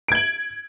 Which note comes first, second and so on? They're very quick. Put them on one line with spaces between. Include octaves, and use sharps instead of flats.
D7 G#6 F#7